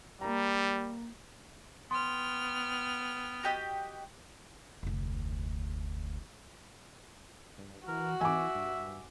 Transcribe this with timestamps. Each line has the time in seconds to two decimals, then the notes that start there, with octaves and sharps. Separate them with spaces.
0.21 G3 A#3 A#5
1.91 B3 G5 C6 F6
3.43 F#4 G4 D#5
4.83 F1 D2
7.58 G2
7.88 E3 F#4 A#4
8.21 E3 E5 G#5 D6
8.55 G2